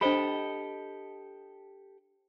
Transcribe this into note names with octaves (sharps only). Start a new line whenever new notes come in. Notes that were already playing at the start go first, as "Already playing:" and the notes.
D4 G4 A4 C5 D#5 B5